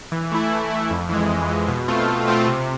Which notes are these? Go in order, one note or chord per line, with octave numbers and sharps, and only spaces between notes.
E3
A3 E4
E3
A3 E4
F2
E3 G#3
F2
E3 G#3
B2
A3 C4 F4
B2
A3 C4 F4
C3